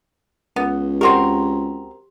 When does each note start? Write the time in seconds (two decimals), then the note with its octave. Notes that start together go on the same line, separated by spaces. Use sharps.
0.56 C#2 B3
1.01 C4 F#4 G4 A#4 C6